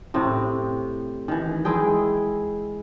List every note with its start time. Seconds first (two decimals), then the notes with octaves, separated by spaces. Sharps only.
0.14 A2 C3 C4
1.28 D#3 E3
1.65 G#3 E4 G#4 G5